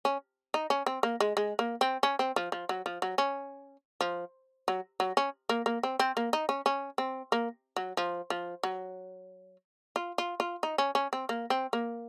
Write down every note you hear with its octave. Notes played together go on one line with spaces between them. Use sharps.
C#4
D#4
C#4
C4
A#3
G#3
G#3
A#3
C4
C#4
C4
F3
F3
F#3
F3
F#3
C#4
F3
F#3
F#3
C#4
A#3
A#3
C4
C4
A#3
D#4
C#4
C#4
C4
A#3
F#3
F3
F3
F#3
F4
F4
F4
D#4
C#4
C#4
C4
A#3
C4
A#3